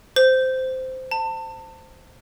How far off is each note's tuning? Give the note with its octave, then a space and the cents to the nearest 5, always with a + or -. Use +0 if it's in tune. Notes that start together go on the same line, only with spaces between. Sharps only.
C5 -10
A5 +30